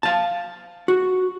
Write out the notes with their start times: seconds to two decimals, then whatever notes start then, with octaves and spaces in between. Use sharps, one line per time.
0.03 F5 A5
0.88 F#4